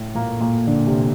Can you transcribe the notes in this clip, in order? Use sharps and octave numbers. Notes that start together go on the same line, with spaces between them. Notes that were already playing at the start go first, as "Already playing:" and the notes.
Already playing: A2 A3
A#2 A#3
A#2 A#3
D3 D4
C3 C4